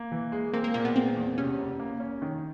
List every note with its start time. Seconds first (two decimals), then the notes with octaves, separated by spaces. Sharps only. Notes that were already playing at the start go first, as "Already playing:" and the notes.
Already playing: A#3
0.12 E3
0.32 G#3
0.53 A#3 C4
0.64 A#3
0.74 A#2 A#3
0.85 B3
0.95 G#3 C4
1.17 E2
1.38 C3 C#4
1.59 F#1
1.80 A#3
2.00 C#4
2.22 D#3